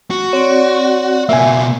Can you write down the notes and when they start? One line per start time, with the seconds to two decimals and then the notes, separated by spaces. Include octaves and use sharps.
0.10 F#4
0.33 C4 C#5 D5
1.29 B2 A#3 E5 G#5